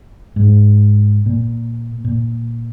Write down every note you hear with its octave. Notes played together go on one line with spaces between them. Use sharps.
G#2
A#2
A#2